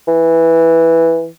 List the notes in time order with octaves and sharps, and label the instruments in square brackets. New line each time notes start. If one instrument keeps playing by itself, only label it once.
[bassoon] E3